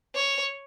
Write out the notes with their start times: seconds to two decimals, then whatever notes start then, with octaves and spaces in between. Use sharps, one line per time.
0.15 C#5